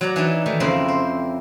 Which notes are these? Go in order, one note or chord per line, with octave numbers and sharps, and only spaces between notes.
F#3 D5 F#5 A#5
E3 D4 D#4 D5
D#3 E3 A3
F2 C#3 A#3 C4 E4
C5